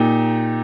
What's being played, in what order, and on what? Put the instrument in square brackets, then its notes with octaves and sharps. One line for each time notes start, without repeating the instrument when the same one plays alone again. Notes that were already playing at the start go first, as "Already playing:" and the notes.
Already playing: [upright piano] A#2 D#4 G4